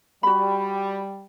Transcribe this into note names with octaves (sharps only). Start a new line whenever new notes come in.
G3 F#4 B5